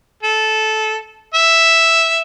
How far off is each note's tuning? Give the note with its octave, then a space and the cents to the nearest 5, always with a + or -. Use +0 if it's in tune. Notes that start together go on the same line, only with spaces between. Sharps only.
A4 -15
E5 +0